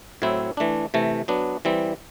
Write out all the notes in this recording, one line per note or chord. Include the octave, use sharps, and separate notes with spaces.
A2 F#3 C4 E4
E3 A3 D4
C3 E3 A3
F#3 B3 D4
E3 G3 C4